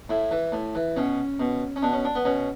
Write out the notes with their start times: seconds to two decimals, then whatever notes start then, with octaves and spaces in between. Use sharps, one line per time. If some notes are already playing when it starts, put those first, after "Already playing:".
0.09 A2 E4
0.31 E3
0.52 A2
0.75 E3
0.96 B2 C#4
1.40 B2
1.76 C#4
1.82 B2 D4
1.93 C#4
2.05 D4
2.15 B3
2.25 B2 C#4